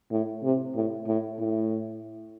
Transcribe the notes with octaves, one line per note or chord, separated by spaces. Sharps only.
A2
C3
A2
A2
A2